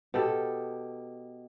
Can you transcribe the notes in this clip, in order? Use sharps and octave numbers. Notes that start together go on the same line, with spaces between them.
B2 G4 A4